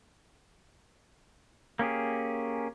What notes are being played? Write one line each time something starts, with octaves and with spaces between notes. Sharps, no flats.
A#3 C#4 G4 G#4